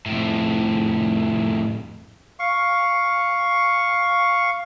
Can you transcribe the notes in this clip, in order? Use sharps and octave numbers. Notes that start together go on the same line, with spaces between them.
F2 A2
F5 C#6